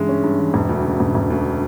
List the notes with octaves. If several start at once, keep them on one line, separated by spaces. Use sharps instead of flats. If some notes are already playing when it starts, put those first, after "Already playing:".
Already playing: G2 C#3 E3 G#3
C#4
G2
E3
E1
D2
C#3
E1
E1
D2